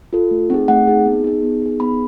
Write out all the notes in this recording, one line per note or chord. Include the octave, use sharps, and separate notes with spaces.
F4 A4
A3
C4 D#4 G#4
A3 F#5
C4 D#4 G#4
B3
D#4 G#4
B3
D#4 G#4
B3 B5